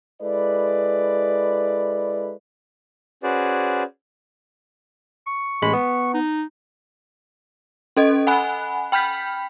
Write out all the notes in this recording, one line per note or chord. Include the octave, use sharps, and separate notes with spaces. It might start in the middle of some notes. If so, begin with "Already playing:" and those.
G#3 E4 A4 B4 D5
C#4 F#4 G#4 B4 C5 D5
C#6
A1 G#3 B5
B3
D#4
C#4 A4 D#5
F#5 G#5 B5 F#6
G5 B5 F6 G6 B6